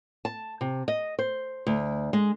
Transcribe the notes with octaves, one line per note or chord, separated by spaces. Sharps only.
A5
C3
D#5
C5
D2
G#3